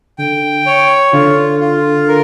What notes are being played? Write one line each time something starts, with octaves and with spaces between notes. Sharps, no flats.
D3 G5
C#5
D3 F4
F4
A#4